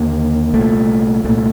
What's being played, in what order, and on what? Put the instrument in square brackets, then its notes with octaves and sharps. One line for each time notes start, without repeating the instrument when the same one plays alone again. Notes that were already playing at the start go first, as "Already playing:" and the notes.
Already playing: [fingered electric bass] D#2 D3 A#3
C2 A#2 A3
C2 A#2 A3